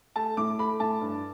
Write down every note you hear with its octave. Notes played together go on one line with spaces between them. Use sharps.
A3 A5
A2 D6
A3 B5
A2 A5
G2